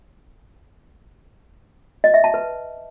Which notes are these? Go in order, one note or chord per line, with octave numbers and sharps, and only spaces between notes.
D#5
E5
A5
B4